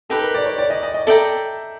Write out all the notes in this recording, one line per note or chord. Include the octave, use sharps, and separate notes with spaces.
D#4 G4 A4 B4
A#4
D5
C#5
D5
D#5
D#5
D#5
A4 D5 E5 G5 A#5